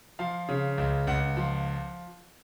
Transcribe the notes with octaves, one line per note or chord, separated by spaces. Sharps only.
F3 F5
C#3
C#2
C#2 F#5
F3